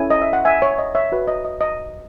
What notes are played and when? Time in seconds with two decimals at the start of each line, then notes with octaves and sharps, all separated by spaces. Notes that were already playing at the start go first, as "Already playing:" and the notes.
Already playing: C#4 E4 A4 G#5
0.10 D#5
0.22 E5
0.33 F#5
0.45 E5 G#5
0.62 C#5
0.78 D#5
0.95 C#5 E5
1.12 F#4 B4
1.28 D#5
1.45 D#5
1.61 D#5